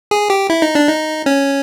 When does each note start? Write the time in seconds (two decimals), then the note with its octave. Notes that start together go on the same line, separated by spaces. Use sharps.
0.11 G#4
0.30 G4
0.50 E4
0.62 D#4
0.75 D4
0.88 D#4
1.26 C#4